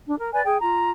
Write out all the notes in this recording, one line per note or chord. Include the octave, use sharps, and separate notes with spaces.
D4
A#4
B4 D5 G#5
G#4 G5
F4 A#5